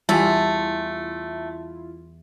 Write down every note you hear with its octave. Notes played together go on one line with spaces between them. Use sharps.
E2 G3 A3 E4 F4